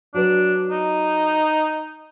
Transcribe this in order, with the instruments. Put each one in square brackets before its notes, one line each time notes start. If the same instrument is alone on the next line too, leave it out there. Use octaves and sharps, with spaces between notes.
[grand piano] F#3 B4 [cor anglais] D4
[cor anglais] D#4